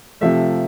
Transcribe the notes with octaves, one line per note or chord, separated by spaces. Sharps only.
C3 F3 A3 E5